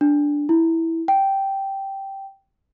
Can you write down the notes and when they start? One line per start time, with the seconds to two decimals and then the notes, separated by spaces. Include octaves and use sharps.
0.01 D4
0.49 E4
1.08 G5